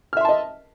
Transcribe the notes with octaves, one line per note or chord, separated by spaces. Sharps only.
D#5 E5 A5 C6 F6